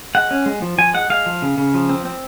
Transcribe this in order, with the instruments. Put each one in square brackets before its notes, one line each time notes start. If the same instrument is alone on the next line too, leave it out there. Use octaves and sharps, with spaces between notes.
[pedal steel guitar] G#3 F#5
C#4
G#3
F3
F3 G#5
G#3 F#5
G#3 F5
F3
C#3
C#3
F3
C4
C4